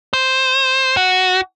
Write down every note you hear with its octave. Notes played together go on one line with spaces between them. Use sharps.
C5
F#4